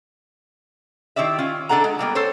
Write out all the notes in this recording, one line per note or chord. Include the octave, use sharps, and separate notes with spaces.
D#3 E4 G4 D5 E5
C#4 F4
D3 D4 A4 F#5 A#5
G#3
G3 A#3 B3
A4 C5 C#5